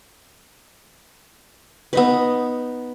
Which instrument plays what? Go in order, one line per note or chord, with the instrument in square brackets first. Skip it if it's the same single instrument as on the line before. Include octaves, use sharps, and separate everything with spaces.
[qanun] B3 D#4 B4